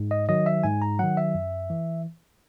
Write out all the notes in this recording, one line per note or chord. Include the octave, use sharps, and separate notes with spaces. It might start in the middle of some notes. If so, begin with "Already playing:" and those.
Already playing: G#2
D#5
D#3 F#3 D#5
E5
G#2 G#5
A#5
D#3 F#3 F#5
E5
F#2
E3